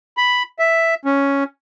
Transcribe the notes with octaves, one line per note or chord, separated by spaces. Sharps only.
B5
E5
C#4